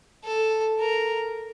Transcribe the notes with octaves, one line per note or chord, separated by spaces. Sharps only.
A4
A#4